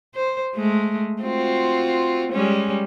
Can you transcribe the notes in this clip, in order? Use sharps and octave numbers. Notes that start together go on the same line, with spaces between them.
C5
G#3 A3
C4 F4 F#4
G3 G#3 C#4